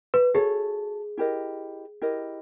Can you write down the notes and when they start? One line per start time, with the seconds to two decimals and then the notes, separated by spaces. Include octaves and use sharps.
0.14 B4
0.34 F#4 G#4 A4 C#5
1.17 E4 G4 A#4 D#5
2.01 E4 G4 A#4 D#5